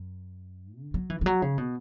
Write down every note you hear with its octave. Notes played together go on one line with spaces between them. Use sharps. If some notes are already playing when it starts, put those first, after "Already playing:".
Already playing: F#2
D3
F#3
E3
E3
F#3
C#3
B2